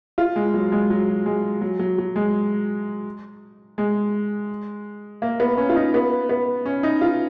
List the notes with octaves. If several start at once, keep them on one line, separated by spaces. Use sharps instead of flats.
F4
G#3
F#3
G#3
F#3
G#3
F#3
F#3
F#3
G#3
G#3
A#3
B3
C#4
F4
D#4
B3
B3
C#4
D#4
F4